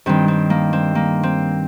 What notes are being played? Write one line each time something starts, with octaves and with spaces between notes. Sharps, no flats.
G2 D#3 C4
C4
A#3
C4
A#3
C4